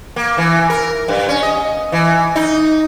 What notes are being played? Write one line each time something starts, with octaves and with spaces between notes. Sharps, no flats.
A#3
E3
A#4
G2
C#4
D#5
E3
D#4